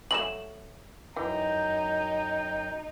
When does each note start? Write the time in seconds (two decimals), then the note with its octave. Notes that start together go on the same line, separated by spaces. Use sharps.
0.11 F#3 G#3 A3 E7 F#7
1.16 F#2 E3 D#4 G5 G6